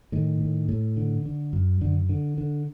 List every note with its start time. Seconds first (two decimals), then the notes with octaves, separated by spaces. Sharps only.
0.12 A2 D#3
0.41 A2
0.69 A2
0.97 D3
1.26 D3
1.53 F#2
1.81 F#2 D3
2.09 D3
2.38 D3